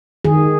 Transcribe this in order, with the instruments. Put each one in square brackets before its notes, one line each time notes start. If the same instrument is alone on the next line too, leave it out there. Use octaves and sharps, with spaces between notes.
[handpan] D#3 G#4